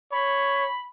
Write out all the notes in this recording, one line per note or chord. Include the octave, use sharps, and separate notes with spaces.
C#5 B5